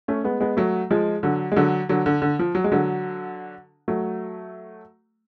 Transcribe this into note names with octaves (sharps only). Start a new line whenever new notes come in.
A3 C#4
G#3 B3
G#3 B3
F#3 A3
F3 G#3
D3 F#3
G#3
D3 F#3
D3 F#3
D3
D3
F3
F#3
G#3
D3 F#3
F#3 A3